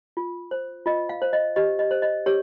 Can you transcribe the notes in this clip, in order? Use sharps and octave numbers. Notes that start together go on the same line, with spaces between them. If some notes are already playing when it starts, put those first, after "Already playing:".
F4
C5
F4 D#5
F5
C5
D#5
G4 D#5
D#5
C5
D#5
G4 C#5